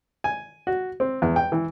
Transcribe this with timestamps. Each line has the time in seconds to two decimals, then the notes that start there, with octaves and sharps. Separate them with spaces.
0.24 G#5
0.67 F#4
1.00 C4
1.22 E2
1.36 G5
1.52 E3